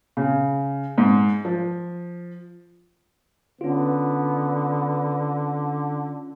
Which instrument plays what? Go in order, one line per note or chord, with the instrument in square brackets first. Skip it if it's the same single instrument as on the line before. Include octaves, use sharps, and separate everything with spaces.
[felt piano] C#3
G#2
F3
[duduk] D3 [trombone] B3 [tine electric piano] C#4 F4